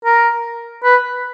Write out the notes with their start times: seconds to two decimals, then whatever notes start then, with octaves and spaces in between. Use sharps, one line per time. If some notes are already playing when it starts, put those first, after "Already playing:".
0.05 A#4
0.84 B4